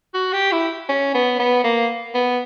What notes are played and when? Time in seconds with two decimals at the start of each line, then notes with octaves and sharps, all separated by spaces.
0.14 F#4
0.33 G4
0.52 E4
0.89 C#4
1.14 B3
1.39 B3
1.64 A#3
2.15 B3